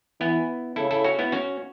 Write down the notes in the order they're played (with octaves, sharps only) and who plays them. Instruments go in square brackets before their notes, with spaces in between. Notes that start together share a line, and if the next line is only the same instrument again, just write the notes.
[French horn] E3 [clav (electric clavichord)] B3 E4
[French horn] C#3 [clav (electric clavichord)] E4 A4
[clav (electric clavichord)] E4 A4
C#4 F#4
B3 E4
C#4 F#4